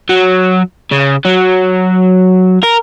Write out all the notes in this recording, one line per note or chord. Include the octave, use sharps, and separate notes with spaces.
F#3
C#3
F#3
A#4